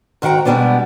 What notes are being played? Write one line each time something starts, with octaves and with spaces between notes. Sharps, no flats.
G#2 D#3 F#4 G5 A#5
B2 G3 G#3 B3 D4